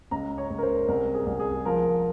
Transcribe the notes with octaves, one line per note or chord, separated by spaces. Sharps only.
C#2 A#5
C#5
C#2
A#4
C5
C2 A#4
G#4
C2
G#4
F3 A#4